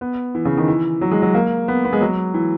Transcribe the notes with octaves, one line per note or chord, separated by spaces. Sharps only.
B3
E3
C#3
D#3
E3
F#3
G#3
F#3
A#3
B3
B3
G#3
F#3
E3